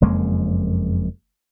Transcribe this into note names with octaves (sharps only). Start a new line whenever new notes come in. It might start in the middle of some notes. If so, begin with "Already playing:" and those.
F#1 F2 G#3 A#3